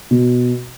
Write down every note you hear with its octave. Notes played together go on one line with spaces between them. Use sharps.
B2